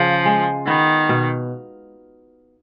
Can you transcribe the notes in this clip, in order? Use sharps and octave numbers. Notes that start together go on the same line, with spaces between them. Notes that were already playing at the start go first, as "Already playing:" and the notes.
Already playing: C#3 F3
G#3
D#3 B3
B2